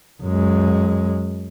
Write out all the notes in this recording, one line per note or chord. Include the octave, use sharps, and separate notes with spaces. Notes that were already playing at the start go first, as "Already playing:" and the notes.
F#2 G#3